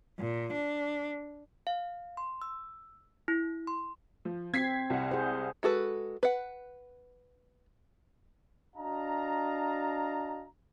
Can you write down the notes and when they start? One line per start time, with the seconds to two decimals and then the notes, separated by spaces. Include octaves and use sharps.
0.19 A#2
0.53 D4
1.67 F5
2.17 C6
2.42 E6
3.28 E4
3.67 C6
4.25 F3
4.54 C4 G#6 B6 C7
4.90 C2 F#5
5.11 G#4 C5
5.63 G#3 F#4 A4 B4
6.23 B4 F#5
8.76 D4 F#4 D#5 F5 A5 A#5